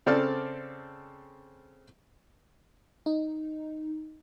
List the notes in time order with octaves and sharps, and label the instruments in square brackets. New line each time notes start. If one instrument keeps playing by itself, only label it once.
[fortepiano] C#3 C4 A4 D5 A5 F6
[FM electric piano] D#4